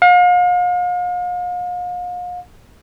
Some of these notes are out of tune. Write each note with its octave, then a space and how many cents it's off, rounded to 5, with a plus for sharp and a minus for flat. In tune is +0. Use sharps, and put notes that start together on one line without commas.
F5 +40